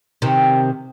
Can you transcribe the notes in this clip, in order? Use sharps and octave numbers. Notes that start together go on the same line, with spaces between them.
C3 D#3